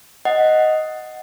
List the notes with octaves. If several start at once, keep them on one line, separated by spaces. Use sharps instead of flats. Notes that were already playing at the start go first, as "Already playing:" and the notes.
D#5 F#5